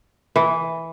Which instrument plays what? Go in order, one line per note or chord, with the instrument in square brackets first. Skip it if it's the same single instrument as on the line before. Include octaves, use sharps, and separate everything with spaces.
[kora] E3